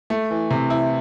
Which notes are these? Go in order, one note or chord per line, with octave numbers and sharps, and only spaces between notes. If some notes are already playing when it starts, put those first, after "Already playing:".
A3
E3
C3
E4